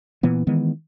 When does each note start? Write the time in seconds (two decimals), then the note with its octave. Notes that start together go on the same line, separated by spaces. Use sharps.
0.23 A#2 E3 B3
0.47 D#3 E3 G#3 B3